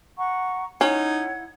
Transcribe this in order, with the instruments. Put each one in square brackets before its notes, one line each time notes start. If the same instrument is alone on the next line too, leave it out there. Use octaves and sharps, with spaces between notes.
[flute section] F#5 A#5 C#6
[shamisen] C#4 [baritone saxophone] D#4 [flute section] E4 F#5 G#6